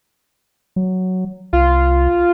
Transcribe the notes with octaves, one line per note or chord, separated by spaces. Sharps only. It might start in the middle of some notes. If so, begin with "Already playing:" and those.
F#3
C2 F4